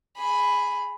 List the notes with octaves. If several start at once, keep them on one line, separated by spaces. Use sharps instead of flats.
G#4 B5